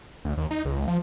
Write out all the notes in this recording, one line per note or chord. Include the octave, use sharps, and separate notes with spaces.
D2
D#2
D#4
C#2
F3